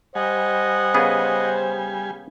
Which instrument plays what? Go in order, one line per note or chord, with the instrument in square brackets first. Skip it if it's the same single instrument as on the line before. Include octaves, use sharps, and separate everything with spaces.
[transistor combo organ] G3 G#5 [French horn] C5 [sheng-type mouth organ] D#5 F#5
[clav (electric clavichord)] C#3 B3 G#4